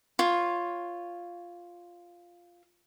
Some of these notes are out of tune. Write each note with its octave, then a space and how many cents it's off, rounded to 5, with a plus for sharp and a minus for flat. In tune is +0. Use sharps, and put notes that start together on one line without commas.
F4 +0 C#5 -5